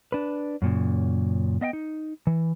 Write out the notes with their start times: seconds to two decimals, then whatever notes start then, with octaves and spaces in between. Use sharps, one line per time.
0.12 D4 B4
0.62 F#2 A#2 C#3
1.61 B3 D#5 F5 G5
1.73 D#4
2.27 E3